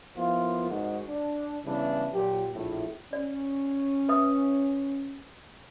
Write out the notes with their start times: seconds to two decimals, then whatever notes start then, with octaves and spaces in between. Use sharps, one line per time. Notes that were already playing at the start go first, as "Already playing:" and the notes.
0.16 F3 A#3 B3 E4 F4
0.70 G#1 G#2 F#4
1.08 D4
1.65 C#3 E3 G3 B3 D4 E4
2.13 A#2 F#3 G4
2.54 A#1 A2
3.13 C#4 D5
4.09 B4 E5 D#6